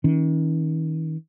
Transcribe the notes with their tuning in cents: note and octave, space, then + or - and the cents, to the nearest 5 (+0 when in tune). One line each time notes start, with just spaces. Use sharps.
D#3 +40 C#4 +0